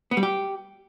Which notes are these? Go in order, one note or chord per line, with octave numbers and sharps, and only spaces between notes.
B3
G3
G4